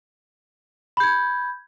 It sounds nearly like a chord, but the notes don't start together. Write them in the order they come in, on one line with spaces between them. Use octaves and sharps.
B5 G6 G#6